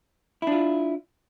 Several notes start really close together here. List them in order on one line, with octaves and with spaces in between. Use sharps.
E4 D4 F4